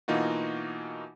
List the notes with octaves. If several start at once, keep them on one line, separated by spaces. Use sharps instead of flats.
B2 E3 A#3 D#4 F4 F#4